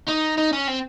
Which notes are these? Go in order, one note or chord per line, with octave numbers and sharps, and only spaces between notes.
D#4
D#4
C#4
C4